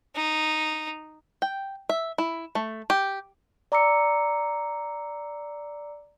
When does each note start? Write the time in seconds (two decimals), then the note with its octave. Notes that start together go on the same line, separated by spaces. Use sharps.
0.16 D#4
1.42 G5
1.89 E5
2.18 E4
2.55 A3
2.90 G4
3.72 D5 A#5 D6 E6 C#7